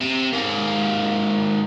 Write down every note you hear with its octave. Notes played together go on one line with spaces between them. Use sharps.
C3
G#2 A#3